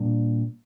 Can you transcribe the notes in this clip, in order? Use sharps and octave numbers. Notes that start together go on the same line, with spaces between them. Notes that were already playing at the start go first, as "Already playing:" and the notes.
Already playing: A#2 G3 A#3 D4